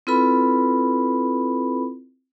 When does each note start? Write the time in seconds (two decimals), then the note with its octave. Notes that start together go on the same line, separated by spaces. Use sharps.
0.07 C4 E4 F4 A4 B4 B5